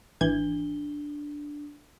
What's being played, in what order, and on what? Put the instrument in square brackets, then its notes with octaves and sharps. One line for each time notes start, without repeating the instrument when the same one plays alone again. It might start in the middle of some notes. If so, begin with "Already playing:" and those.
[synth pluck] G#1 E3 G#6 [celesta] D4 G7